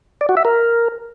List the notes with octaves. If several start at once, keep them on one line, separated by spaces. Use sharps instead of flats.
D5
F#4
E5
A#4